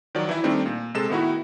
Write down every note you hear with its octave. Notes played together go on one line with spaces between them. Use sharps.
D#3 F3 F#3 D5
E3 E4
D#3 G3 A3 C4 D4 D#4
A#2
C3 G#3 A4 E7
A2 D#3 B3 D#4 E4 F#4